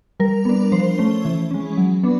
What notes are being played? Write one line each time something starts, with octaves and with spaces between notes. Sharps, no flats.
G3 A#4
B3 D4
F3 C5
A3 C#4
E3
G#3 C#4
F#3
B3 D4